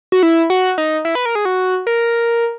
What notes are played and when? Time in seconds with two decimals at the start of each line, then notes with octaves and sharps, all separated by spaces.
0.12 F#4
0.23 E4
0.50 F#4
0.78 D#4
1.05 E4
1.15 B4
1.26 A#4
1.35 G#4
1.45 F#4
1.87 A#4